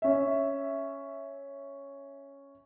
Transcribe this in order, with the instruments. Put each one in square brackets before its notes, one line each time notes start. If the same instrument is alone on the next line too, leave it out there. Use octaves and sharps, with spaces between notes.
[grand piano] C#4 E5